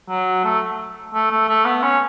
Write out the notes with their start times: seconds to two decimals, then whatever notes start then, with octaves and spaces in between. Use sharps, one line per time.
0.09 F#3
0.44 A3
1.14 A3
1.31 A3
1.49 A3
1.65 B3
1.83 C#4